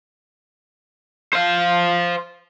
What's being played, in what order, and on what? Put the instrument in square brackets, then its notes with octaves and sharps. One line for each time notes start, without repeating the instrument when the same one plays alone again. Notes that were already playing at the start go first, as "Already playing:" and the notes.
[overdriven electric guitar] C5 F5